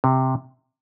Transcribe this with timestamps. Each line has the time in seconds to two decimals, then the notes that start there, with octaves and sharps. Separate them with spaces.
0.04 C3